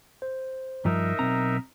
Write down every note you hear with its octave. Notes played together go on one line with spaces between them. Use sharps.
C5
G2 F3 D#4 A#4 E5
B1 F#2 C4 A#5